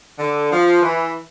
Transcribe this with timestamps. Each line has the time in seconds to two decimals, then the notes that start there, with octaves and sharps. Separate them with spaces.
0.19 D3
0.51 F3
0.82 E3